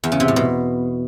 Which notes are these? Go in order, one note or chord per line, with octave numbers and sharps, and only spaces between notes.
E2
C#3
C3
A2
B2